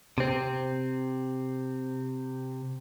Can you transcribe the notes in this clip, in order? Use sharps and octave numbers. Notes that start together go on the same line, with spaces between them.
C3 C4